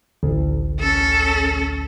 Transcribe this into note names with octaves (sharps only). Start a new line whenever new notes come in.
A1 D2
C#4 A4